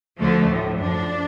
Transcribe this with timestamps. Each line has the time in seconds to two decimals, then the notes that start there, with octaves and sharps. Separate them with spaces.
0.18 D2 D3 F3 A3
0.49 A2 F3
0.78 F#2 F3 D4